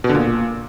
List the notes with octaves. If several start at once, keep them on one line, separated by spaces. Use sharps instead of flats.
B2
D3
A#2